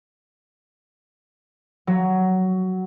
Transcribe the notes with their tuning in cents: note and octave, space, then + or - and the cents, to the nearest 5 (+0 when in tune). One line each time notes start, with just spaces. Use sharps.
F#3 +10